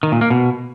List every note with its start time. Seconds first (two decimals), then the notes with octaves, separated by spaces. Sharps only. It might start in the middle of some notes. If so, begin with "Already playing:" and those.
0.03 D#3
0.12 A#2
0.21 A#3
0.30 B2